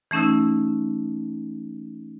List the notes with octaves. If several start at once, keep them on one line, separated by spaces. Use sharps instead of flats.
E3 A3 C#4 D#4 E6